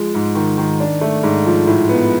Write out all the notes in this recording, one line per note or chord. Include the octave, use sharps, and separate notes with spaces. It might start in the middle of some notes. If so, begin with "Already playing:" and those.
Already playing: F3 G#3
G#2
D#3
D#3
D4
A3
G#2
F3
A2
B3